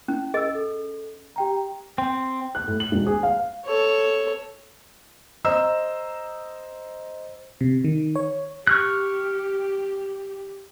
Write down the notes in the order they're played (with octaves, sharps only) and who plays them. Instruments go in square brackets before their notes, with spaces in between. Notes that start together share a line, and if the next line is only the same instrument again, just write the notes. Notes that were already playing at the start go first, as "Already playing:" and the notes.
[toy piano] C#4 [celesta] E4
[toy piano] G#4 D#5 [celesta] E6 A6
[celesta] A4
G4 G5 A#5
[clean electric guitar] C4
[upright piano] F#6
A2
F#7
E1
G#4
F5
[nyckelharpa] A4 C#5
[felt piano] C5 D#5 A#5 E6
[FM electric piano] C3
D#3
C#5
[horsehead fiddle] G4 [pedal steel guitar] C#6 F6 F#6